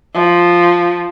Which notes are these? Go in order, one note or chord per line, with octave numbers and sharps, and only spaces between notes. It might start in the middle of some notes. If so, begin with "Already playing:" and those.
F3